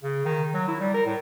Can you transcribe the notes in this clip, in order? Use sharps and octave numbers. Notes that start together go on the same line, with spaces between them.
C#3
D#3
F#3
E4
G3
A#4
A2